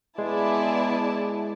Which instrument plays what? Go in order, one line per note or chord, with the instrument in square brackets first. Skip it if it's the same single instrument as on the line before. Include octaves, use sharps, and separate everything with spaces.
[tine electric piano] G#3 [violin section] B3 E4 G#4 D5 A5